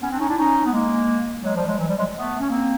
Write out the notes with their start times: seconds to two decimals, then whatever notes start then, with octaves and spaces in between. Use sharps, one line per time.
0.02 B3 C#4
0.10 C4 D4
0.19 C#4 D#4
0.28 D4 E4
0.37 C#4 D#4
0.64 B3
0.72 G#3 A#3
1.43 F#3 G#3
1.55 F3 G3
1.67 F#3 G#3
1.78 E3 F#3
1.87 F3 G3
1.96 F#3 G#3
2.14 A3 B3
2.40 C#4
2.50 A#3 C4